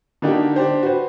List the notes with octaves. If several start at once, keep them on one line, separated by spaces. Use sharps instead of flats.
D3 A#3 D4 D#4 F#4 G4
D4 G4 C5
F#4 B4 C5